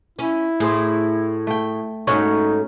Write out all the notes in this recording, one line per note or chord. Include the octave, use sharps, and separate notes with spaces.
C#4 E4
A2 G#4 C5
A3 G5
G#2 A3 C#4 D#4 F#4 C#5